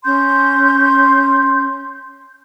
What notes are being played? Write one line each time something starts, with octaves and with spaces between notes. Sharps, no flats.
C#4 C6 G6